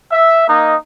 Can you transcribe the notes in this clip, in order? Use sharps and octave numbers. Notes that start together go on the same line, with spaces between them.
E5
A#3 D#4 D#5